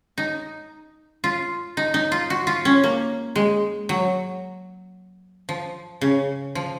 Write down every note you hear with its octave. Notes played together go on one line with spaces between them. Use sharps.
D#4
F4
D#4
D#4
F4
F#4
F4
C#4
A#3
G#3
F#3
F3
C#3
F3